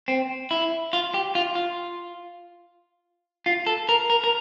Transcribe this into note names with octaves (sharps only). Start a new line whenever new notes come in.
C4
E4
F4
G4
F4
F4
F4
A4
A#4
A#4
A#4